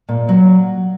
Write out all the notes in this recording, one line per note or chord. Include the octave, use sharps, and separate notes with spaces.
A#2
F#3